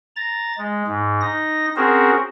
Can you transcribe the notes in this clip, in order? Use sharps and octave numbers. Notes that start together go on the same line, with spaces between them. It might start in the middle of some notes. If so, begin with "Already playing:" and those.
A#5 A6
G#3
G#2
D#4 A#6
C4 C#4 F#4 G#4 A#4 C5